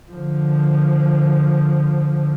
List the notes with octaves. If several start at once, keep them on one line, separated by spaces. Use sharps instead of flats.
D3 F3